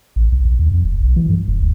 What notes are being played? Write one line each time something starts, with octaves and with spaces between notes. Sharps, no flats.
A1
C2
B1
D#2
F2
F1
B1
E3
G2
F1
D2